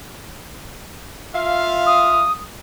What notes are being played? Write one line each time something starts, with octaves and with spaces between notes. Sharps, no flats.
F4 E5 F5
D#6